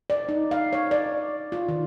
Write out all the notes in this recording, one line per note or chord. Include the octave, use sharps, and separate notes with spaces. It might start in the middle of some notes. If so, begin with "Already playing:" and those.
D5
D#4
F5
C#5
D5
F4
D#3